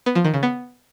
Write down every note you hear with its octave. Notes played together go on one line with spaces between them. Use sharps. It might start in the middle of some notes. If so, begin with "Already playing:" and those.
B3
F3
D#3
C#3
B3